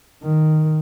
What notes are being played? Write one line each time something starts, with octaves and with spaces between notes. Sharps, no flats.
D#3